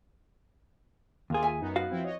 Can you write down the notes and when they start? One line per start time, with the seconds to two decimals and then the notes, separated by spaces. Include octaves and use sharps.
1.30 D#2 A#3 F4 G#4
1.42 E5 G#5
1.60 F#2 B3 D#4
1.76 F#4 B4 F5
1.89 F3 C4 E4
2.04 C#5 D#5